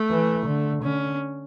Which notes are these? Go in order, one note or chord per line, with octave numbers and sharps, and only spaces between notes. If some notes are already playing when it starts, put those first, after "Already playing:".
Already playing: A3
E3
D3
D3 C#4